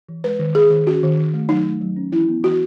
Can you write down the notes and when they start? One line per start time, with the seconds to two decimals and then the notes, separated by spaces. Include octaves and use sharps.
0.09 E3
0.24 G#3 B4
0.39 D#3
0.55 D#3 G#4
0.71 D#3
0.86 C#4 F#4
1.03 D#3
1.18 D#3
1.34 A3
1.49 F#3 D#4
1.65 A3
1.81 F#3
1.96 C#4
2.12 E3 E4
2.28 B3
2.43 E3 F#4